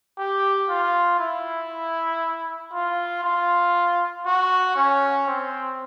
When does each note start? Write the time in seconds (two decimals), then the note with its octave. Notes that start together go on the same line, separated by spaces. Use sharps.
0.18 G4
0.69 F4
1.19 E4
2.73 F4
3.24 F4
4.25 F#4
4.76 C#4
5.27 C4